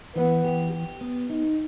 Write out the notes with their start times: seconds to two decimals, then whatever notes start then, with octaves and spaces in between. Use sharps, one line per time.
0.15 E3 B3
0.45 G4
0.72 G4
1.01 B3
1.30 D#4